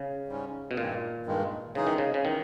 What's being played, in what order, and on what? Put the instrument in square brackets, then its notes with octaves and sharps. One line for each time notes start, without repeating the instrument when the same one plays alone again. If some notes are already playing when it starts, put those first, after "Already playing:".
Already playing: [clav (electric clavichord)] C#3
[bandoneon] G#2 G3 C#4
[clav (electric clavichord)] B2
[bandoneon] G2 D#3 G#3 [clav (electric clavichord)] A#2
[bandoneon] G2 D#3 G#3
[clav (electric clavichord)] C#3 [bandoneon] E3 G#3 D#4 G#4
[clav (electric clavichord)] D#3
C#3
C#3
[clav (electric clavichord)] D#3 [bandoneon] E3 G#3 D#4